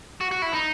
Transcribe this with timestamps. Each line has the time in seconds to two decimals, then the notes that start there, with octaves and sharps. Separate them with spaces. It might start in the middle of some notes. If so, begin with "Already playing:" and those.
0.21 F#4
0.31 F#4
0.42 E4
0.53 D#4